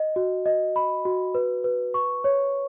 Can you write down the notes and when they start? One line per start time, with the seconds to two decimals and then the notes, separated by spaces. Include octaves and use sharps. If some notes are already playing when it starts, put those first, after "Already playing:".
Already playing: D#5
0.16 F#4
0.46 D#5
0.76 B5
1.05 F#4
1.35 B4
1.64 B4
1.94 C#6
2.24 C#5